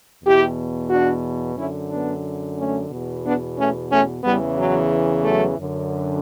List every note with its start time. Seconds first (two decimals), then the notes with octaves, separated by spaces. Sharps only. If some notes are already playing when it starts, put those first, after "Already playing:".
0.23 E2 B2 E4 G4
0.90 D4 F#4
1.56 F#2 D3 C#4 E4
1.90 B3 D4
2.57 A3 C#4
2.91 E2 B2
3.24 B3 D4
3.57 A3 C#4
3.90 A3 C#4
4.24 E2 C#3 E3 G3 B3
4.57 F#3
5.23 F#3 A3
5.58 F#2 D3